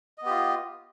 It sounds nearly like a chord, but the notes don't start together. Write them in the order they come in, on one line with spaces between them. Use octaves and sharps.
D#5 B3 G4 F4